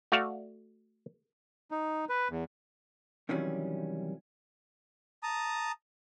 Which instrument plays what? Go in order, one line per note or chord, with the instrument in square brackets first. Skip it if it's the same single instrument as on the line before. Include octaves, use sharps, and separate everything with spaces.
[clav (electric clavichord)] A3 F#4 D5 E5 F5
[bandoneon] D#4
B4
E2
[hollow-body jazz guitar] C3 D#3 E3 F#3 G3 C#4
[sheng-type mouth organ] A5 A#5 D#6